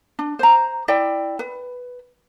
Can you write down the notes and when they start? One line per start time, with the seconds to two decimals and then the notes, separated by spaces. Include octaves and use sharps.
0.19 D4
0.39 C5 A#5
0.88 E4 D5 G5
1.39 B4